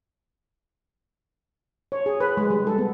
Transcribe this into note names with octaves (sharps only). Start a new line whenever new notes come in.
C#5
G#4
B4
G#3
G3
A4
B3